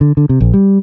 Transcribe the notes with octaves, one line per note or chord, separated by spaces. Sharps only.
D3
D3
C3
A#1
G3